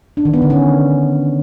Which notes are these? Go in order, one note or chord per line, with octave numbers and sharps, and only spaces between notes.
D4
D#3
B3
D3
C#4